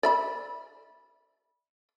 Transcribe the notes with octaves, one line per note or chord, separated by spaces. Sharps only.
D5 E5 B5